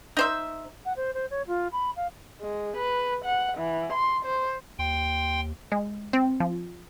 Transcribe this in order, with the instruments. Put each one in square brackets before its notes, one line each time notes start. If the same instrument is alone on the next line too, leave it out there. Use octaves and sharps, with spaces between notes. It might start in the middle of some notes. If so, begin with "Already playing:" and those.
[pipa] D#4 C5 E5
[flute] F#5
C5
C5
C#5
F4
B5
F5
[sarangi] G#3
B4
F#5
E3
C6
C5
[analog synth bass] D#2 [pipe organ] G5 C6
[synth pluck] G#3
C4
F3